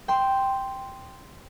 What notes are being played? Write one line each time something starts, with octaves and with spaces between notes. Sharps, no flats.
G5 C6